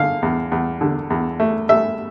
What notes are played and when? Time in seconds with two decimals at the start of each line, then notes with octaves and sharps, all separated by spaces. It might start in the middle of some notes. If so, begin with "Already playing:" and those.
Already playing: D3 F5
0.22 E2
0.51 E2
0.81 D3
1.10 E2
1.40 A3
1.69 A3 E5